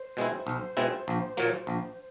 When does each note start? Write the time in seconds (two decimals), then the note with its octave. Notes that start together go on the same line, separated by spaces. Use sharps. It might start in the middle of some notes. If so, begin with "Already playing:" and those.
Already playing: C5
0.17 B2 G#3 C4 E4
0.47 B1
0.77 B2 G#3 C4 E4
1.08 A#1
1.37 A#2 F#3 A#3
1.67 A#1